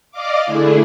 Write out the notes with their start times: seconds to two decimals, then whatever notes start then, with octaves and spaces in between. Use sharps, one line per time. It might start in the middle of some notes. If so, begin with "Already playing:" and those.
0.11 D5 D#5 F5 D6
0.45 D3 A3 D4 E4 G#4